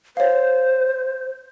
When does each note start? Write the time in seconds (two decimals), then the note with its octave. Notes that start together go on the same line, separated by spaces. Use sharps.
0.17 C5 C#5 F5